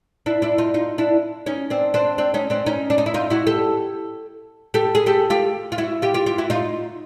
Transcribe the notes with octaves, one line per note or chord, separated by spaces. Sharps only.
D4 E4
D4 E4
D#4 F4
D#4 F4
D4 E4
C#4 D#4
C4 D4
C4 D4
C4 D4
C#4 D#4
C4 D4
C#4 D#4
D4
D#4
E4
D#4 F4
E4 F#4
G4 A4
G4 A4
G#4
G4 A4
F4 G4
F4
E4 F#4
F4 G4
F4 G4
F4 G4
E4 F#4
D#4 F4